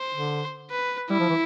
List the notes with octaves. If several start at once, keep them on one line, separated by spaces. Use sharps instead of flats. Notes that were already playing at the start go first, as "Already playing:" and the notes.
Already playing: C5
D3
B4
G3 E4
F3
E3